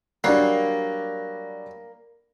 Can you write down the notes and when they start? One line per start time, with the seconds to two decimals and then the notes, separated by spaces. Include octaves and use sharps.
0.24 F#3 G3 A#3 B3 D4 D5 C7